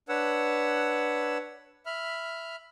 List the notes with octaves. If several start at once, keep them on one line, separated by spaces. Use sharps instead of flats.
D4 B4 C#5 F#5 E6
E5 B5 F6